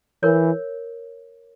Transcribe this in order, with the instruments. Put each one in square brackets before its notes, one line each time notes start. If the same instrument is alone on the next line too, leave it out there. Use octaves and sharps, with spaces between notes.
[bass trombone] E3 [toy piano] A#4 C#5